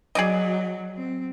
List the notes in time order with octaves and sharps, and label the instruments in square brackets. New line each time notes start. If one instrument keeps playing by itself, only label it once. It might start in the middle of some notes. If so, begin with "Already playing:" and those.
[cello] F#3 [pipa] G#4 D5 D#5
[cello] C4